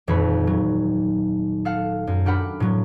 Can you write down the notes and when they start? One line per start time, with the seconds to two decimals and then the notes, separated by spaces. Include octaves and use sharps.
0.07 D#1 F2 E3 C#5 B5
0.47 F#3
1.65 A4 F5 F#5
2.07 F#2
2.25 D4 G4 A#4 F#5 B5 D6
2.60 A2 F#3